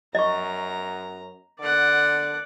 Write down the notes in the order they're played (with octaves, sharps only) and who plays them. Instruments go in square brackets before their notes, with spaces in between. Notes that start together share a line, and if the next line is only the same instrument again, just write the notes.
[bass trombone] F#2 [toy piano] D#5 C#6 [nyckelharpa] A#5
[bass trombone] D3 [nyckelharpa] D5 F#5